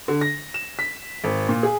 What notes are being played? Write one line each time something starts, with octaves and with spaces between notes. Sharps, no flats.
D3
A#6
E7
B6
G#1
A#2
G#4